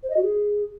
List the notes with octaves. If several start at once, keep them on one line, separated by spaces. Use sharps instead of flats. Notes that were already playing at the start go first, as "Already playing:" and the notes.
C5
D#5
F#4
G#4